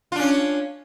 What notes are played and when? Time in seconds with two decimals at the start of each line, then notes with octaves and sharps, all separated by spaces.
0.12 F4
0.16 D4
0.19 C#4